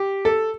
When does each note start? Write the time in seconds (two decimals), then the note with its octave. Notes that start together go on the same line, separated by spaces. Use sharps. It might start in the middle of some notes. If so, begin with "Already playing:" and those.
Already playing: G4
0.25 A4